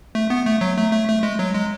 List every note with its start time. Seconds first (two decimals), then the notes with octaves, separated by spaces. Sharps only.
0.15 A3
0.30 B3
0.45 A3
0.61 F#3
0.77 A3
0.92 A3
1.08 A3
1.23 G#3
1.39 F#3
1.54 G#3